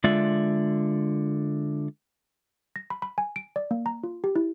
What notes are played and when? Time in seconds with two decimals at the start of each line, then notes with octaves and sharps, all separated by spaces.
0.04 D3 G#3 F4 D5 E5
2.76 A#6
2.90 B5
3.02 B5
3.18 G#5
3.36 D7
3.56 D5
3.71 A#3
3.86 A#5
4.04 F4
4.24 G4
4.36 E4